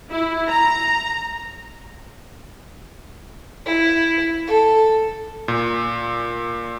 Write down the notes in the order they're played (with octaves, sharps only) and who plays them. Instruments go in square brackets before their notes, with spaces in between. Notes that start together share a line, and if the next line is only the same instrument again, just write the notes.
[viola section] E4
A#5
[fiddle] E4
A4
[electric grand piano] A#2